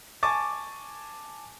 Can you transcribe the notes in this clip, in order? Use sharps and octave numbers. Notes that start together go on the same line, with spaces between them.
G#5 A5 C#6 D6 A6